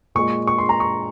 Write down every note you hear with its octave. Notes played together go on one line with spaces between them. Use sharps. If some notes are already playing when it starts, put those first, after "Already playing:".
A#2 G#3 C#6
C#6
C6
A#5
C#6